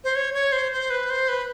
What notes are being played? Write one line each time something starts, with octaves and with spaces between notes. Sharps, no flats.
C5
C#5
C#5
C5
C5
B4
C5
B4